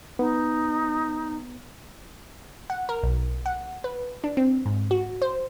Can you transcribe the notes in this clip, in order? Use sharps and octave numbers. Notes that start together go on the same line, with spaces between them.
B3 D#4
F#5
A#4
B1
F#5
B4
D4
C4
G#2
F#4
C5